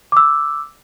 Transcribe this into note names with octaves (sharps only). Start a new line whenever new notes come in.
D6 E6